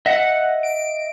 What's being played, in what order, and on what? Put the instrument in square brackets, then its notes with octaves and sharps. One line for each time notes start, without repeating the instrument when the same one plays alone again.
[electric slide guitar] D#5 E5 [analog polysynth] F#5
[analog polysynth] D7